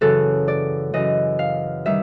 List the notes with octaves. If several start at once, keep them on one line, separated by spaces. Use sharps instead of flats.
F#2 C#3 E3 A4
D5
F#2 C#3 E3 D#5
F5
D#3 G3 E5